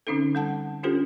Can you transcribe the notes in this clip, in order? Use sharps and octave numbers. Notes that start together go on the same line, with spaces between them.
D3 C4 C#4 D#4 A4
G3 F#5 A5
C#4 D4 F4 G4 A4 C5